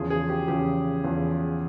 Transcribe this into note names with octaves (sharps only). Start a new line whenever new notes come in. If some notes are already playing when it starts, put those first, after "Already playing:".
Already playing: E2 C#3 F3 G#4
G#4
G4
E2 C#3 F3 G4
E2 C#3 F3